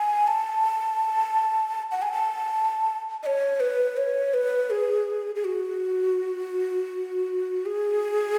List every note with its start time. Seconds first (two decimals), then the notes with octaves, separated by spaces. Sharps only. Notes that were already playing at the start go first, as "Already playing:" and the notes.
Already playing: G#5
0.28 A5
1.92 F#5
2.02 G#5
2.12 A5
3.23 D#5
3.26 C#5
3.60 B4
3.97 C#5
4.34 B4
4.70 G#4
5.35 G#4
5.45 F#4
7.66 G#4